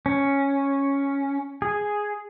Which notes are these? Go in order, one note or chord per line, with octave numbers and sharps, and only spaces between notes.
C#4
G#4